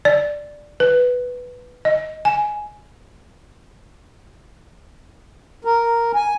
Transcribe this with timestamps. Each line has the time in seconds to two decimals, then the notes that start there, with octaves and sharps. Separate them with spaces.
0.05 D5
0.80 B4
1.85 D#5
2.25 G#5
5.65 A#4
6.15 G#5